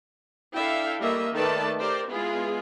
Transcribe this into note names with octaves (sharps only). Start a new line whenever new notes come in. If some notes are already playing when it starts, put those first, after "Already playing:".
D4 E4 A4 E5 F5 G5
G3 A3 A#3 D#5 E5
D#3 A3 A4 B4 D5 A5
G4 A#4 C5 D5
G#3 B3 E4 F4 G#4